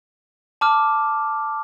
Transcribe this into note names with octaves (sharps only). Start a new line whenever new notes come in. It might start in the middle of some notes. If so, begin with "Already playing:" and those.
A5 D6 F6